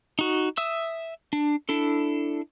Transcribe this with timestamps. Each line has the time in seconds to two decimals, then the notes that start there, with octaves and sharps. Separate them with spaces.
0.19 D#4 F#4
0.57 E5 D#6 E6
1.33 D4
1.69 D4 E4 A4